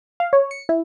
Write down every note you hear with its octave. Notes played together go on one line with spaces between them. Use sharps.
F5
C#5
C#7
E4